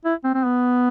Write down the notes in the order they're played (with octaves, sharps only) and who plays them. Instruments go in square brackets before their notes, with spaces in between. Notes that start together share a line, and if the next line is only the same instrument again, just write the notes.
[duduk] E4
C4
C4
B3